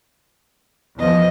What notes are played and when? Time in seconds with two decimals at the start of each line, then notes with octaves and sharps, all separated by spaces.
0.99 E2 F3 D#5